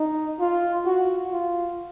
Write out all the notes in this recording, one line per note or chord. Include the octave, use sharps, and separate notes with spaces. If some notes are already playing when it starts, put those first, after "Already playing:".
Already playing: D#4
F4
F#4
F4